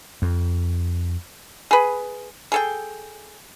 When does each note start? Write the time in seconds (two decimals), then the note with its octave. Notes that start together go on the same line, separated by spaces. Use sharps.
0.22 F2
1.71 G#4 B4
2.52 G#4 A4 G5